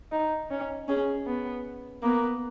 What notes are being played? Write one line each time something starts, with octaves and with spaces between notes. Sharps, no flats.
D#4
C#4
C#4 G#4
B3
A#3 B3